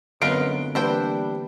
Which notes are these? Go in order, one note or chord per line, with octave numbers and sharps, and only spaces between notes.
F#2 D3 G#3 B3 C4 F4 B4 D7
E3 G3 A#3 D4 E4 B4 C5 G5